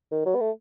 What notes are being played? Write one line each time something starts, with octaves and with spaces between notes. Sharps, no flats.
D#3
F#3
B3
A3